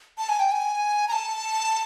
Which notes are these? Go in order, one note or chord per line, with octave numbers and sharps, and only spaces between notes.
A5
G#5
G5
G#5
A#5
A5